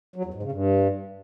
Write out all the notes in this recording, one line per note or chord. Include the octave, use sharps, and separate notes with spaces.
F#3
E2
G#2
C#3
G2